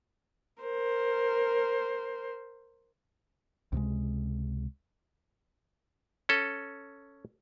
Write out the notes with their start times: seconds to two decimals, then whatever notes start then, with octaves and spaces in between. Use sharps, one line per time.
0.62 A#4 C5
3.72 C#2 C3 F3 G#3
6.29 C#4 A4